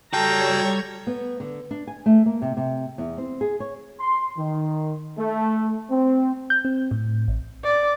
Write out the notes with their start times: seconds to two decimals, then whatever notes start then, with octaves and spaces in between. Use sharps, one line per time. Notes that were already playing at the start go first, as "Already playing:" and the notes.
0.13 G3 F#4 A4 C#5 G5 A5 A#5 G#6
1.07 B3
1.40 D3
1.71 D4
1.87 G#5
2.06 A3
2.26 A#3
2.42 C3
2.57 C3
2.98 E2
3.18 C4
3.41 G#4
3.60 C#5
4.00 C6
4.37 D#3
5.18 A3
5.90 C4
6.50 G6
6.65 C4
6.91 A2
7.28 A1
7.64 D5